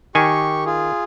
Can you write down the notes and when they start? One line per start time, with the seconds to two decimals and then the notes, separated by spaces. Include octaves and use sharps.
0.15 D#3 G4 G#5 C#6
0.66 F4 G#4